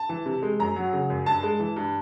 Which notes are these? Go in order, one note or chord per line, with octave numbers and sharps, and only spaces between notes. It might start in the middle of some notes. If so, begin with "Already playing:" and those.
Already playing: A5
E3
C3
G#3
F#2 A#5
F#3
C#3
F#2
G2 A5
G#3
E3
G2